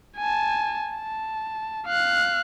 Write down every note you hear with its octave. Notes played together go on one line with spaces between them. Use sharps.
G#5 A5
A5
F5 F#6